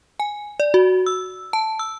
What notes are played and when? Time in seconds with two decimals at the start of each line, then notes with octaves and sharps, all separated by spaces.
0.20 G#5
0.60 D5
0.74 F#4
1.06 E6
1.53 A5
1.79 E6